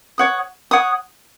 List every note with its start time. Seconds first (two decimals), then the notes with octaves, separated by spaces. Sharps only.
0.18 C#5 F#5 D#6
0.71 C#5 F#5 D#6